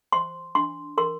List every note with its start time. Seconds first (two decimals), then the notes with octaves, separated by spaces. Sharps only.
0.12 C5 C6
0.55 D4 C6
0.98 A#4 C6